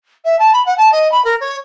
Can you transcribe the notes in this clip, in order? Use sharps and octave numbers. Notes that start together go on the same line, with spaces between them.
E5
A5
B5
F#5
A5
D#5
B5
A#4
C#5